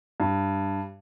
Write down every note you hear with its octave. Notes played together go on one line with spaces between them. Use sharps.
G2